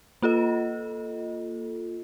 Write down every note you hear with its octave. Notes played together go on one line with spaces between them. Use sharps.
A#3 F4 A4 D#5